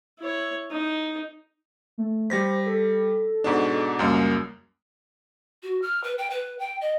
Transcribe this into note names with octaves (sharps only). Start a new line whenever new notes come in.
E4 C#5
D#4
A3
G3 C5 A#6 B6
A4
G#2 B2 D4
C#2 F#2 G3 A#3
F#4
F6
B4
G5
B4
G5
D#5